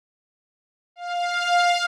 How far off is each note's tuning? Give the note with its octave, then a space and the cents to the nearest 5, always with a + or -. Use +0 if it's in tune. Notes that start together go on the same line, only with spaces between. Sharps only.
F5 +10